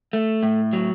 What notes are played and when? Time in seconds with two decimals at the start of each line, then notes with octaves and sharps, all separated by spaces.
0.13 A3
0.43 A2
0.73 F#3